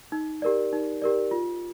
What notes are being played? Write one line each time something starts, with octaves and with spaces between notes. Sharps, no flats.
D#4
G4 A#4 D5
D#4
G4 A#4 D5
F4